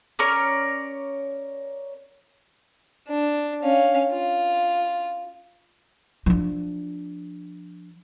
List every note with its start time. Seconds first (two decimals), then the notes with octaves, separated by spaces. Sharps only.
0.19 C#4 A#4 C#5 D5
3.08 D4
3.62 C#4 F5
4.12 F4
6.26 F3 D4